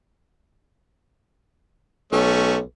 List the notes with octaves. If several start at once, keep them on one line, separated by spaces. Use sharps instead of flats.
B1 A3 C#4